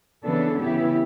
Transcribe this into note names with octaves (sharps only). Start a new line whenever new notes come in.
C#3 E3 B3 D4 A4
C#3 E3 B3 E4 G4